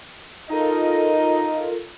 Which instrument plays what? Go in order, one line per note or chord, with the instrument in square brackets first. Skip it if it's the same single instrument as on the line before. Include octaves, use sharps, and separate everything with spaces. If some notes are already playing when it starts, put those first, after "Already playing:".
[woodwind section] D#4 D#5 [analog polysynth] F4 A4 A#4